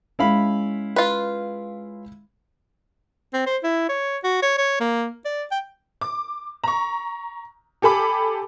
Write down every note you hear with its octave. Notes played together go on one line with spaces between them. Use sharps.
G#3 C#4 E4 F5 B5
F4 B4
C4
C5
E4
C#5
F#4
C#5
C#5
A#3
D5
G5
D6
A#5 C#6
G4 A4 G#5 B5 D6